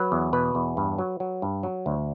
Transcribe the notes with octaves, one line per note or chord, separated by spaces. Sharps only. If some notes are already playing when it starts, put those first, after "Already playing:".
Already playing: F#3 B4
E2
B2 B4
E2
G2
F#3
F#3
G2
F#3
D2